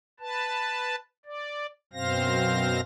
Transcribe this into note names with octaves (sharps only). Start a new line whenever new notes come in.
B4 A5
D5
F#2 B2 C4 C5 F5 A#6